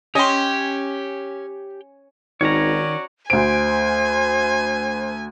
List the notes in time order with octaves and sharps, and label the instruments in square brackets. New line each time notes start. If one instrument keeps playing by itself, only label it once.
[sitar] C#4 [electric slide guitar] G4 G5 [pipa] D#5 C6
[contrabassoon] G#1 [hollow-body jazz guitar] D#3 [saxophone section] C#4 F#4 D5 [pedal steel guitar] C#5 A#5
[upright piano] D2 D7 [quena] C5 [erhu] G#5